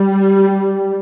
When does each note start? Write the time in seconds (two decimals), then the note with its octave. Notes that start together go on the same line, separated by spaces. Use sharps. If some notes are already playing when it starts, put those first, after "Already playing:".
Already playing: G3